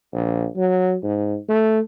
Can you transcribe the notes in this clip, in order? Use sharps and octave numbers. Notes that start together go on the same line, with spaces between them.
A#1
F#3
G#2
A3